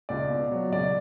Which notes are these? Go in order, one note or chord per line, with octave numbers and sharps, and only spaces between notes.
C#2 D5
B2
F#3
C#2 D5